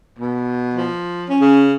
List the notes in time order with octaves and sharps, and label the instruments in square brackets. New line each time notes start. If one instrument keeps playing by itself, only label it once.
[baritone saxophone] B2
[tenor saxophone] F3
[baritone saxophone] C#4
[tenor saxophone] C#3